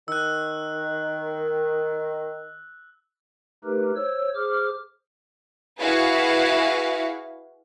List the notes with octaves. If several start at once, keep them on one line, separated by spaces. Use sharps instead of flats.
D#3 E6 F#6
A3 D#4 G4 A#4 B4
C5 C#5 E6
G#4 C5 D6 F6
E4 F#4 G#4 B4 F5